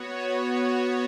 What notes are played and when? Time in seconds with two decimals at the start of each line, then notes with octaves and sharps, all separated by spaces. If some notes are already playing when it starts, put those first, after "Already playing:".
Already playing: B3 F#4 C#5
0.29 B3 F#4 C#5